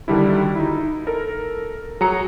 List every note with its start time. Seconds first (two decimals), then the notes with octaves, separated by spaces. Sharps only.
0.08 D3 D#3 G3 D4 E4
0.42 F#4
0.55 D#4 E4
1.07 A4 A#4
2.01 F#3 G#4 A#5 C#7